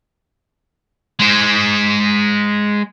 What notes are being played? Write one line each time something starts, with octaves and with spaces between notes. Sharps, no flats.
G#3 C5